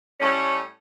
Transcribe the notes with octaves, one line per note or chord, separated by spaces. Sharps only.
A2 G3 A3 C#4